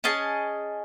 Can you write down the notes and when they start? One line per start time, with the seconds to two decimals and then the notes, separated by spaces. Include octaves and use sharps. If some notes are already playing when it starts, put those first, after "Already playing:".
0.04 C#4 G#4 D#5 A5